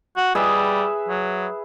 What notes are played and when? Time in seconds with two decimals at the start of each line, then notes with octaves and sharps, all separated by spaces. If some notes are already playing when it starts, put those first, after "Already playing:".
0.17 F#4
0.35 G3 G#4 B4 E5
1.08 F#3